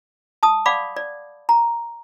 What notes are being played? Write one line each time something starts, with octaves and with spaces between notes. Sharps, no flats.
A5 D#6
D5 F5 F#5 B5 D6
D5
A#5